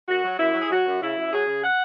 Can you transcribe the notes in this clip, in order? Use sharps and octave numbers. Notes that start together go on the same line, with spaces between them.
F#2 F#4
F#3
F#2 E4
F#3
G#4
F#3 F#4
F#2
C#3 E4
F#2
F#3 G#4
C#3
F#5